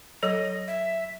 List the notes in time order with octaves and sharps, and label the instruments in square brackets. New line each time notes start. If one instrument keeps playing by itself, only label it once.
[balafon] F#3 A4 C#5 [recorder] D#5
[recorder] E5